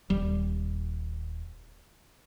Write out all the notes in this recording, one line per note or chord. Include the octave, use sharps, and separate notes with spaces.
D#1 G3